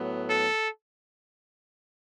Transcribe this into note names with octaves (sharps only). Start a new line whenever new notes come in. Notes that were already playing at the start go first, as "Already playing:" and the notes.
Already playing: A2 F#3 B3
A4